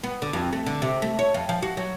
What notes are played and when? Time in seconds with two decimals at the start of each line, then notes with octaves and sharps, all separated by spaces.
0.04 B3
0.22 D3
0.33 F2
0.53 A3
0.66 D3
0.82 C3
1.02 A3
1.19 C#5
1.34 F2
1.49 F3
1.63 F#4
1.77 F#3